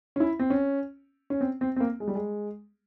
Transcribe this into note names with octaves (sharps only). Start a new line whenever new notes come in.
C#4
E4
C4
C#4
C#4
C4
C4
C4
A#3
G#3
G3
G#3